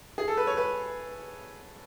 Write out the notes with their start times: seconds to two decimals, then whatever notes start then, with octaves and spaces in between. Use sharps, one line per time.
0.18 G#4
0.28 A4
0.37 B4
0.47 C#5
0.57 B4